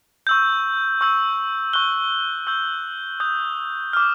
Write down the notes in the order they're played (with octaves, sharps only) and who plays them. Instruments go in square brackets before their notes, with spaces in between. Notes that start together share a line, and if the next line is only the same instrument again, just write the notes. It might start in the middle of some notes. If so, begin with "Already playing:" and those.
[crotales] C#6 E6 G6
C#6 E6 G6
C#6 F#6 G7
C#6 E6 G6
D#6 G6
D6 F6